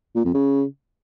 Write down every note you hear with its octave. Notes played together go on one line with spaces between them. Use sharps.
A#2
F2
C#3